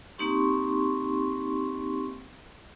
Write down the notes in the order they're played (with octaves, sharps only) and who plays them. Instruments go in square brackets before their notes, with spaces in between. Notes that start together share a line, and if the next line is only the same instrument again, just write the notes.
[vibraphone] A#3 C4 D#4 G4 C6 C#6